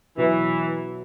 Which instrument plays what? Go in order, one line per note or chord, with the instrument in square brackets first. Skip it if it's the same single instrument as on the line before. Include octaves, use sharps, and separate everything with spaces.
[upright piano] B2 F#3 B3 [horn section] E3